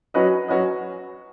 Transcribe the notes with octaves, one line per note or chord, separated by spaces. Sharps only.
F#3 C#4 F#4 B4 D#5
F#3 C#4 F#4 B4 D#5